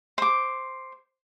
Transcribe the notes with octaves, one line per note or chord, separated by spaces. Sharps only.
C5 D6